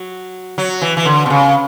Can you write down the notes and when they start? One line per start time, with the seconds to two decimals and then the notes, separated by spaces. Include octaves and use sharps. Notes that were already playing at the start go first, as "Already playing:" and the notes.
Already playing: F#3
0.58 F#3
0.82 E3
0.97 E3
1.05 D3
1.26 B2
1.30 C#3